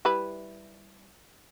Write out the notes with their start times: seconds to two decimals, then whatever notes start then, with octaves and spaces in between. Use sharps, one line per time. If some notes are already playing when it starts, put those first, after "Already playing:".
0.05 G3 E4 B4